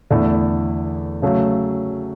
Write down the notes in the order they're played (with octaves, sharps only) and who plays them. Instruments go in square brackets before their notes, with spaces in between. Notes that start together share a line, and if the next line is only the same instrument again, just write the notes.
[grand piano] E2 D3 A3 E4
C#3 F#3 A3